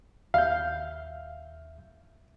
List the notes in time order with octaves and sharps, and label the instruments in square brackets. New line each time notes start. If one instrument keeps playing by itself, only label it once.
[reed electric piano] D#2 E5 G6 [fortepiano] F5